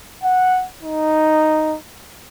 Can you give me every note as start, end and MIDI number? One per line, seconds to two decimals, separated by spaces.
0.24 0.65 78
0.83 1.76 63